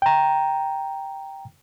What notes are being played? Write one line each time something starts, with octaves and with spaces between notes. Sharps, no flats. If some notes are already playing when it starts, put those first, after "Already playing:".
G5 A#5